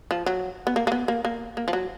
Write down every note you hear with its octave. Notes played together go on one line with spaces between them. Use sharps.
F3
F#3
B3
A#3
A#3
B3
A#3
A#3
A#3
F3
F#3